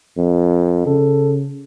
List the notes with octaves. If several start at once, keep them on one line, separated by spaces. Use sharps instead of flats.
F2
C#3 A4